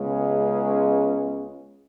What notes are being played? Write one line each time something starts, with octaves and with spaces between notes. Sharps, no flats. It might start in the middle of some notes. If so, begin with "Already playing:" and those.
Already playing: C#2 C#3 G#3 B3